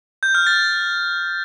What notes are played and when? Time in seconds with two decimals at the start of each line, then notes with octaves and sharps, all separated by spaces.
0.23 G6
0.35 F6
0.47 A6